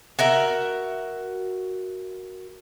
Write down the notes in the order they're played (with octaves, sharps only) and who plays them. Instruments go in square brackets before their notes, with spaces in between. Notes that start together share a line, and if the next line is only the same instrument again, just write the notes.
[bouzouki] F#4 A#4 E5